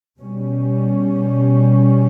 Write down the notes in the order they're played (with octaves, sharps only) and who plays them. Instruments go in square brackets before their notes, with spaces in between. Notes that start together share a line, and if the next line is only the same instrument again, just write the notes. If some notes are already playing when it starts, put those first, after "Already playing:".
[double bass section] B2 G3 C#4